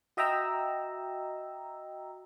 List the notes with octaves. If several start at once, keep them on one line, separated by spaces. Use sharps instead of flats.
F#4 D#5 E5 G5 A#5 E6